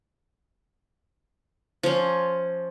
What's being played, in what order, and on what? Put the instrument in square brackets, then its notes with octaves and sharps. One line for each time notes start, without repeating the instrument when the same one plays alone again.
[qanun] F3 C#4